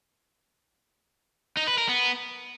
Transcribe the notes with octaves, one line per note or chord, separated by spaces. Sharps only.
D#4
B4
A#4
B3